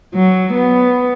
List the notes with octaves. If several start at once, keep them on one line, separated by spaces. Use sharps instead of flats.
F#3
B3